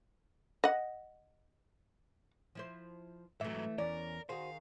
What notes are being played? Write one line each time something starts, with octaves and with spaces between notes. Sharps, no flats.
D#5 F#5
F3 E4 C5
G#2 E3 F#3 A3 E5
E2 E3 C#4 A#4 D5
D#3 F#4 G#4 C5 F5